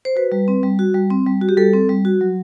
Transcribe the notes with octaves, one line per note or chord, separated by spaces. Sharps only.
C5
F#4 B4
G3
C4
G3
F#4
G3
C4
G3
F#4
G4
G3 A4
C4
G3
F#4
F#3